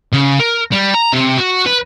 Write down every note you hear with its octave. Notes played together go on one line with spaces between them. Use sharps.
C#3
A#4
G3
A#5
C3
F#4
B4